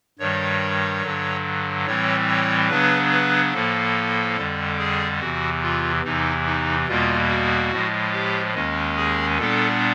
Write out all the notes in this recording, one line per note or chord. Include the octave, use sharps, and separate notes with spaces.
G2 D#3 G3 C#5
G2 D3 F#3
A2 E3 G3 C4 C#5
C#5
C#3 F#3 B3 D4 B4
B4
A2 F3 A#3 A4
F2 D3 G3
G#4
E2 C3 E3 F#4
F4
E2 C3 E3 D#4
D#4
E2 B2 G3 A#3 F4
F#4
A2 F3 G#3
G4
D#2 D#3 G#3 C#4
G#4
A#2 G3 B3 D4 A4